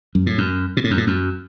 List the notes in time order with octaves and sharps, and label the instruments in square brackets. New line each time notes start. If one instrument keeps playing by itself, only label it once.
[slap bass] F#2
A2
F#2
B2
A2
F#2
A2
F#2